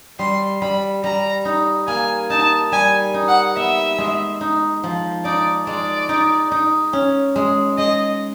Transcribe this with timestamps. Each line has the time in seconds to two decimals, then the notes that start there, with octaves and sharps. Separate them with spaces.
0.19 G3 C6
0.61 G3 B5
1.04 G3 A#5
1.45 D#4
1.88 A#3 G#5
2.30 D#4 A5
2.72 G3 G#5
3.14 D#4
3.28 F#5
3.56 B3 E5
3.98 G#3
4.41 D#4
4.84 F3
5.25 D#4 D5
5.67 G#3 D5
6.09 D#4
6.51 D#4
6.93 C#4
7.36 G#3
7.78 G#3 D#5